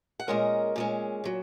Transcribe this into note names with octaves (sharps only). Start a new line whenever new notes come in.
F#5
A#2 G#3 C#4 A#4 D#5
A#2 G#3 C#4
A#2 F#3